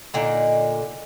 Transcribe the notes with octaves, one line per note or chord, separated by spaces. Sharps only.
A#2 D3 D#4